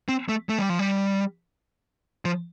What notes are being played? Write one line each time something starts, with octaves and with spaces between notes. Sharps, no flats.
C4
A3
A3
G3
F3
G3
F3